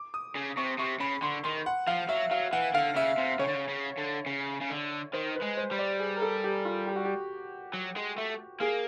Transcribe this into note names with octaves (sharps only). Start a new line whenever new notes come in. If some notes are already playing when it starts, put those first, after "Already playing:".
Already playing: D6
D#6
C#3
C3 C#6
C3 C#6
C#3 B5
D3 C6
D#3 C6
F#5
F3 F5
F#3 E5
F#3 F5
E3 F#5
D3 F5
C#3 E5
C3
C#3 C#5
D3
C#3
C#3
D3
C#3
C#3
D3
D#3 C5
B4
G#3
C5
G3
D5
G#4
A#4
A4
G4
F4
G4
F#4
G4
F#3
G#3
A3
A#3 G#4